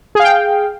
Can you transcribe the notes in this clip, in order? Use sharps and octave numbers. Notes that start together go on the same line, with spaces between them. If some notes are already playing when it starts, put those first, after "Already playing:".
G#4 F5 G5